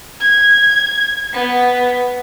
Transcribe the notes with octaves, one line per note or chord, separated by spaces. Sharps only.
G#6
B3